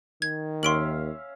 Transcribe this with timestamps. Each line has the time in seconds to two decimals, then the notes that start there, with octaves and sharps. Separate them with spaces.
0.22 D#3 G#6
0.63 D#2 C#4 E5 F5 C6 D7 F#7